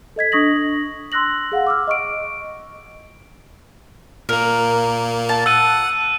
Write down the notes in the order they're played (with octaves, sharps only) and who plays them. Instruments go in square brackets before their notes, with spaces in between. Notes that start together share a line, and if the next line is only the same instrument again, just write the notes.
[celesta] A4 D#5 G#6 B6
D4 C#6 D#6 A#6 F#7
C6 E6 F#6 A#6 F#7
G#4 F5 F#5
D6 E6 F6
D#5 C#6 D7
[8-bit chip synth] A#2 A#3 [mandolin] A#4
[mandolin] A5
[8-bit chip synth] F#5 [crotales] E6 F#6 D#7